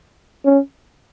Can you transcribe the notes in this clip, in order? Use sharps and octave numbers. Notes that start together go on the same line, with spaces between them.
C#4